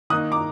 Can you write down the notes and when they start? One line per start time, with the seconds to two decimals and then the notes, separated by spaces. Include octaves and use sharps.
0.10 D#3 A#3 D#4 D#6 F#6
0.32 A#5 D6